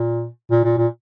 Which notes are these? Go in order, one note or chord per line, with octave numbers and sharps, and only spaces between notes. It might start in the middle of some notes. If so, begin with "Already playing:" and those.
Already playing: A#2
A#2
A#2
A#2